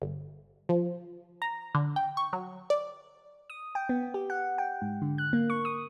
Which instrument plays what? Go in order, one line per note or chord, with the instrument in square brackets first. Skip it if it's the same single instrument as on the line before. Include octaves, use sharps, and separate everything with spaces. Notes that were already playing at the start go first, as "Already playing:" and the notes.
[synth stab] G1
F3
A#5
D3
G5
C#6
F#3
D5
[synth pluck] D#6
G5
B3
G4
F#5
G5
G#2
D3
F#6
A#3
C#6
D#6